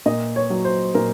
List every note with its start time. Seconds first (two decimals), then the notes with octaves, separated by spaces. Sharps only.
0.06 A#2 D#5
0.36 C#5
0.50 F#3
0.65 C5
0.95 A#2 A#4